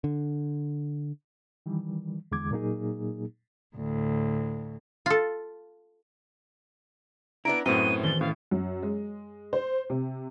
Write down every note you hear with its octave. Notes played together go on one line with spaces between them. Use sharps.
D3
D#3 E3 G3
E2 D3 G#3 D6 G#6
A#2 F#3 A#3 D#4 G#4
D2 A2
F4 A4
B3 D4 E4 A#5 D7
F#2 A2 B3 C4 F#4 D#7 G7
D#3 E3 A6 G7
A2 C#4 F5
F#2
G#3
C5
C3